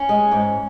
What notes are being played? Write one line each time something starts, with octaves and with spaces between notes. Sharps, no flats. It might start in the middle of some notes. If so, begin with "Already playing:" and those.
Already playing: C#4
G#3
G#2